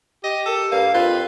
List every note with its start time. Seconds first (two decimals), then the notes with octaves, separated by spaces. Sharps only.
0.24 G4 D#5
0.46 A4 A#4
0.72 G2 A#3 F5
0.94 F2 F4 B4